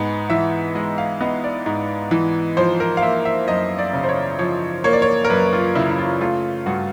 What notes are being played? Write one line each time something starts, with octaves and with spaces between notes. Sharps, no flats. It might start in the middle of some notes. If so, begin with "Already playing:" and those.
Already playing: G#2 B3 G#5
E3 E5
G#3 D#5
F5
B3 D#5
D5
G#2
E3
F3 C5
A#4
F5
A#3 E5
E5
F#2 D#5
D5
C#3
C5
C#5
F3 C#5
A#3 C#5
D5
C#5
A#4
F#2 B4
F4
C#3 E4
E4
F4
A3 F4
G2 F#4